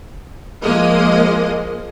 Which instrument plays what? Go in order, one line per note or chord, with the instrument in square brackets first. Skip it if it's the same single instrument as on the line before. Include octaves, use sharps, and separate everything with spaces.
[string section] F3 G#3 A#3 D#5